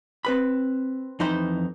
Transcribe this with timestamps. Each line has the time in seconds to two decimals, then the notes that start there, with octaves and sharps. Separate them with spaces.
0.25 C4 B4 B5
1.20 F2 E3 D#4 C5 B5